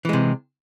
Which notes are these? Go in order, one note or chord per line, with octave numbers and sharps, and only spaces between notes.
C3 E3 G#3